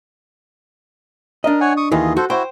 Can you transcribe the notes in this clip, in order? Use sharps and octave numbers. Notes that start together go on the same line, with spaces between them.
D4 A#4 D#5
C#5 F#5 G#5
C#6 D#6
D#2 D#3 E3 F4 G#4 D#5
F#4 A4 C5
E4 F#4 C5 G5